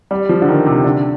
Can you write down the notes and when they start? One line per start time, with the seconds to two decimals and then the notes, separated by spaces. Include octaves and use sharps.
0.11 G3
0.29 F3
0.42 D3
0.48 D#3
0.66 C3
0.84 D3